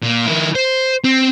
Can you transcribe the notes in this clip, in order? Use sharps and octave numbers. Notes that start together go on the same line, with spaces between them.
A#2
D#3 E4
C5
C4